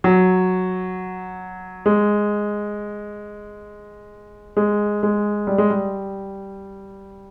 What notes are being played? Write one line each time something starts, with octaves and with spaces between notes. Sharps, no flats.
F#3
G#3
G#3
G#3
G3
G#3
G3